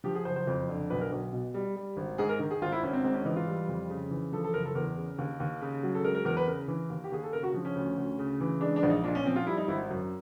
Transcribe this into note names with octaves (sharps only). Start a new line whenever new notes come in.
F3 G4
G#4
F#1 C5
C5
F2
D3
B1 B4
A#4
B1
B2
G3
G3
G#1
G#2 G#4
A#4
D#3
G#4
G#1 F4
E4
G#1 C#4
C4
G#2 C4
C#4
E3 D#4
F4
G3
F2
C#3
E3
F3 A4
A4
F#1 A#4
A4
E2 A#4
C#3
D#2
D#2
C#3
F#3
A4
G#3 A#4
A#4
E2 A#4
B4
C#3 A#4
E3
D#2
G4
D#2 G#4
A4
C#3 A#4
F#4
F3
C#4
D2
D2
C#3
E3
G#3 D4
D4
A#1
D#4
A#2 D4
C#4
F3 C4
F4
G3 E4
D#4
G#1 E4
F#2